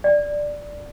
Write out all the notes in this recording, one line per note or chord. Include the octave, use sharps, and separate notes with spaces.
D5